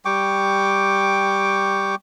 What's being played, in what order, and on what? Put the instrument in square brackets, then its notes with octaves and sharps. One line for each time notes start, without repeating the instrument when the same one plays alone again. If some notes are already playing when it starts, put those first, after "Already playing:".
[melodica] G3 G5 C#6 D6